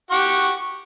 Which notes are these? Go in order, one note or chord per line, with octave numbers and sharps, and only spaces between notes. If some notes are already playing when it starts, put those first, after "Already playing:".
G4 F#5 C#6